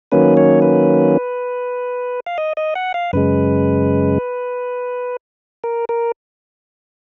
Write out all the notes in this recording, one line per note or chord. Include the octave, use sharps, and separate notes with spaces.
D#3 F#3 A#3 C#4 B4
C#5
B4
F5
D#5
D#5
F#5
F5
F#2 C#3 G#3 B4
A#4
A#4